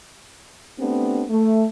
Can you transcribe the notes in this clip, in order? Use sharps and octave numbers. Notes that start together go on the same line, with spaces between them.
A3 B3 C4 D4 G4
A3